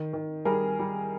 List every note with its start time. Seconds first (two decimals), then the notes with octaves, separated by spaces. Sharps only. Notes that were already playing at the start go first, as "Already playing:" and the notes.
Already playing: D#3
0.13 D#3
0.45 G3 G#4 A#4
0.79 G3